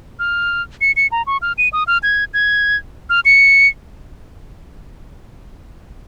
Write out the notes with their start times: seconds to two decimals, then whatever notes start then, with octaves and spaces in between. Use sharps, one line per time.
0.19 F6
0.81 C#7
0.96 C#7
1.12 A#5
1.27 C#6
1.42 F6
1.58 D#7
1.73 D#6
1.87 F6
2.03 G#6
2.34 G#6
3.10 F6
3.25 C#7